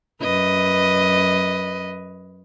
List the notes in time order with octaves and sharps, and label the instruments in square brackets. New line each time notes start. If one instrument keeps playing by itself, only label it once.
[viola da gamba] F#2 B4 D#5